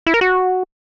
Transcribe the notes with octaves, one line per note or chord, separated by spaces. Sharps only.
E4
A#4
F#4